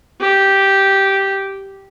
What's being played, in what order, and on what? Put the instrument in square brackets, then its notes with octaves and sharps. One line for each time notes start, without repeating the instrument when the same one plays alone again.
[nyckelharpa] G4